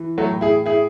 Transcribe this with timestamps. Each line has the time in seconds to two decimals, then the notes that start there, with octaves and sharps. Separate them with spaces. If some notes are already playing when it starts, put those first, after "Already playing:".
Already playing: E3
0.18 F#3 A3
0.29 A2
0.41 E4 G#4
0.66 E4 G#4